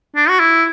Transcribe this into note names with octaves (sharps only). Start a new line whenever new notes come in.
D4
F#4
E4